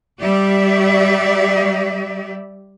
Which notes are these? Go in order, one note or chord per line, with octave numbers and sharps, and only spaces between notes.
G3 G4 D5 E5